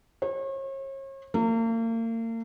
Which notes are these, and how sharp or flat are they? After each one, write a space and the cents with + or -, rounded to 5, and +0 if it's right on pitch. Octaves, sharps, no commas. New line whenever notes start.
C#5 -40
A#3 -40